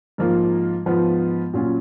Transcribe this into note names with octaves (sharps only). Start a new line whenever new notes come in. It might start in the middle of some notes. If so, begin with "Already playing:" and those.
G#2 F3 A#3 F4
G#2 F3 B3 F4
A#2 F#3 C#4 F4